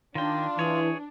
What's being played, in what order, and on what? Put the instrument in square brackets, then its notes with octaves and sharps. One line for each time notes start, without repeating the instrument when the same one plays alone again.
[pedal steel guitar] D#3 G5 [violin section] D4 [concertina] F4
[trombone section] E3 [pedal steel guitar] G#4 C#5